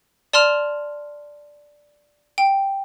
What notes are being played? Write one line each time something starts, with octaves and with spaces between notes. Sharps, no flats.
D5 A5 C6 F6 F7
G5